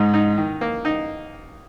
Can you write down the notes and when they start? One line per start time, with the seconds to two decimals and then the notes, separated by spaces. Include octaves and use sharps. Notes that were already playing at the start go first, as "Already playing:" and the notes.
Already playing: G#2 D#4
0.14 D#4
0.37 D#3
0.61 A#3
0.85 D#4